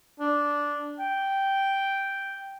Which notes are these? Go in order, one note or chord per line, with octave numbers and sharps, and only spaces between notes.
D4
G5